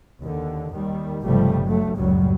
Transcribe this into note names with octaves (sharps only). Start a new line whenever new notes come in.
D#2 D3
D#2 D#3 G3
G1 C#2 C3 F3 G3 A3
G2 F#3 A3
F#1 C#2 F#2 A2 F#3 G3